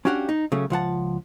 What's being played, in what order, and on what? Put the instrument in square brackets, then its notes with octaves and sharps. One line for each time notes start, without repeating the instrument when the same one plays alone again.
[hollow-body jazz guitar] C#4 D4 F#4 G4 F5 F#5
D#4
C#3 F#3 A3 C#4
C#2 F3 F#5 A5